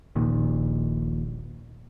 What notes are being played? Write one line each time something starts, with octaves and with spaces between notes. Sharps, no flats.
D#1 A#1 A#2 D#3